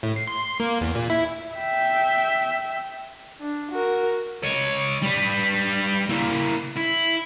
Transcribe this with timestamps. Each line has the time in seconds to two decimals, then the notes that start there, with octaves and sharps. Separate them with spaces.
0.03 A2
0.16 C7
0.27 C6
0.40 C6
0.60 A#3
0.81 E2
0.95 A#2
1.10 E4
1.55 E5 G5
3.40 D4
3.71 F#4 A#4
4.43 C#5 D#5
5.02 G3 B4
6.09 A#3 E4
6.76 E4